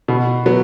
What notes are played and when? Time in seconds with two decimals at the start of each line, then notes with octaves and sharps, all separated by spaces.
0.08 B2
0.46 F#3 B3